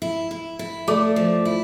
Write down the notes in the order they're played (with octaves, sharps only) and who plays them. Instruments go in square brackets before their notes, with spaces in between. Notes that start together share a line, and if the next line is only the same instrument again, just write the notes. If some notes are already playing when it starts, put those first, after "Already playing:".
[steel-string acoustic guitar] E4
E4
E4
[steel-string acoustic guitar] A3 [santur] D5
[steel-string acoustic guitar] F3
E4